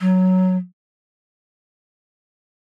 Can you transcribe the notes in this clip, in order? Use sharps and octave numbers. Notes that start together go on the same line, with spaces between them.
F#3